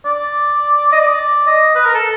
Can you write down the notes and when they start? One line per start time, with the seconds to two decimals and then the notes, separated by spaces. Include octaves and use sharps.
0.05 D5
0.92 D#5
1.00 D5
1.47 D#5
1.75 B4
1.85 A#4
1.94 A4